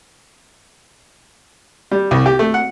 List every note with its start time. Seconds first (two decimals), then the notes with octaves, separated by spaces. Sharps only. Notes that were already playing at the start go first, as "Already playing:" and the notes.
1.92 G3
2.11 C2
2.26 G4
2.39 A3
2.54 F#5